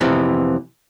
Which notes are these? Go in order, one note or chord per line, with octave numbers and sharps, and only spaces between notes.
F2 C3 E3 B3